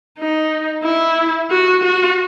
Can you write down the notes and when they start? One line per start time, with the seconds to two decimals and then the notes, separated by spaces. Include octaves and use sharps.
0.18 D#4
0.84 E4
1.51 F#4
1.84 F#4